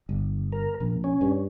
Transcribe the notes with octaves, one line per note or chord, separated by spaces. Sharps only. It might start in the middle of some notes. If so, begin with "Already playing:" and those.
G1
A#4
A#1 A#2
C#4
G2